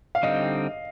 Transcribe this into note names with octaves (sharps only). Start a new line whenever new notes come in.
F5
D3 G3 C4 D#4 D#5